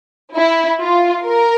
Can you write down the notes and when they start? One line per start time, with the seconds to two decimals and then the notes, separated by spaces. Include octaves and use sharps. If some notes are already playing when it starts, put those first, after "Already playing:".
0.35 E4
0.80 F4
1.26 A#4